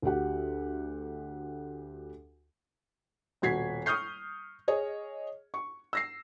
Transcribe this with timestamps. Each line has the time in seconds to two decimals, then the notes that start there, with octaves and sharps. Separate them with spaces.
0.02 D2 F#4 G4 F#5
3.42 D#1 B2 F#4 G#6 B6 C7
3.86 C#6 D#6 F6 G6 C7
4.68 G#4 C#5 D#5
5.54 C#6
5.93 E6 A#6 C7